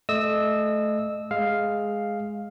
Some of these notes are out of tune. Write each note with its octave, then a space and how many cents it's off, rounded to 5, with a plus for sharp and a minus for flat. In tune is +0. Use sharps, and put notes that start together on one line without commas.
A3 -25 D#5 -30 E6 -15
G#3 +0 F5 +0